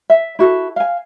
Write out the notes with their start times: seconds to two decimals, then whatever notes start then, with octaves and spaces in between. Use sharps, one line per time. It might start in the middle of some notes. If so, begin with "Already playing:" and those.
0.10 E5
0.39 E4 F#4 A4
0.76 F5 G#5